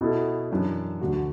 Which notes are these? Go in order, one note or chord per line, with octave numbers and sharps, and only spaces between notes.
B2 B3 E4 A4
F#2 E3 D4
D2 D3 A3 F#4